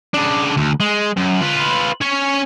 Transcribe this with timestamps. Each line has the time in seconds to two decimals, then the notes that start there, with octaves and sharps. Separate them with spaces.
0.14 C#3 D4
0.57 D2
0.80 G#3
1.17 F#2
1.41 F4 B4
2.01 C#4 C#5